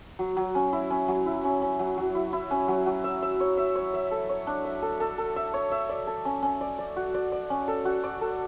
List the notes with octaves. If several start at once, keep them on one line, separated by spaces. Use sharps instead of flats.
F#3
F#3
C#4
E4
C#4
F#3
E4
C#4
C#4
F#3
F#3
E4
E4
C#4
F#3
F#3
E5
E5
C#5
E5
C#5
E5
A4
C#5
D4
E5
A4
A4
A4
E5
C#5
E5
D5
A4
C#4
C#4
D5
D5
F#4
D5
D5
C#4
A4
F#4
D5
A4